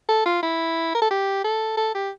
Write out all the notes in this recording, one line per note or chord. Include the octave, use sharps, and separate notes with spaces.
A4
F4
E4
A#4
A4
G4
A4
A4
G4